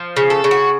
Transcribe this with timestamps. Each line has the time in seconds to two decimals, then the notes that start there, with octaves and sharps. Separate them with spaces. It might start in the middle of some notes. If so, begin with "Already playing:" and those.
Already playing: F3
0.17 C#3
0.30 A4
0.44 C#3
0.51 F#4